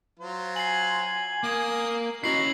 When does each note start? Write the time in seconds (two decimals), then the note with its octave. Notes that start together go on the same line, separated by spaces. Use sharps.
0.19 F#3 F4 C5
0.56 G#5 C7 F#7
1.44 A#3 D#6
2.24 C#4 D#4 E4 F#4 C7 F#7